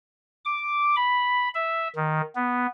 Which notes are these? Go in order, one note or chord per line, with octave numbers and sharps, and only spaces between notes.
D6
B5
E5
D#3
B3